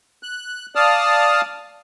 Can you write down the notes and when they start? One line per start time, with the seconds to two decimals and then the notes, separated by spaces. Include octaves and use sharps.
0.23 F#6
0.75 D5 F5 A5 D#6 F6